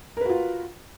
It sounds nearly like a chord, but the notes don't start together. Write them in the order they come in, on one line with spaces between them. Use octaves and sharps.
A#4 B4 F#4 F4